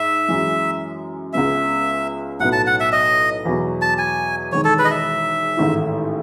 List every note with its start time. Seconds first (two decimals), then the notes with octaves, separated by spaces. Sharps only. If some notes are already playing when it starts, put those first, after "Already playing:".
Already playing: G#2 E5
0.28 F#2 E3 G#3
1.33 C#2 C#3 G#3 B3 E5
2.40 B1 A2 F#3 B3 F#5
2.52 A5
2.67 F#5
2.80 E5
2.92 D#5
3.45 E2 B2 F#3 B3 F#4
3.82 A5
3.98 G#5
4.52 E1 E2 D#3 G#3 C#5
4.64 A4
4.79 B4
4.85 D#5
4.91 E5
5.57 A1 G#2 D#3 A3 E4